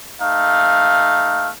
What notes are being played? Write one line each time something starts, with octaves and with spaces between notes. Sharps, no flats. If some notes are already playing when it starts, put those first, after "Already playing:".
A3 D#4 F5